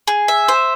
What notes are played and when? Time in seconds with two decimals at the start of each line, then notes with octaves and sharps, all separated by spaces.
0.08 G#4
0.28 E5
0.48 C5